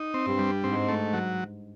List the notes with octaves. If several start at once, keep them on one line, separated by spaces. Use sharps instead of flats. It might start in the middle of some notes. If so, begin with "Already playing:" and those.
Already playing: D#4
C4
G2 G3
G3
G#2 G#3 C4
A3
F#3